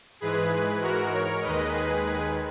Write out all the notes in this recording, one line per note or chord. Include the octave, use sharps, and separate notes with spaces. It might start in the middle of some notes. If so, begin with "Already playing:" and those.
G#2 E3 G#3 G#4 B4
F#4 A#4
A#4 C#5
D#2 D#3 G#3 B4 D#5
G#4 B4
G#4 B4